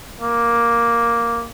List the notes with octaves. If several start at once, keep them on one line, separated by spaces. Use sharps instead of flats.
A#3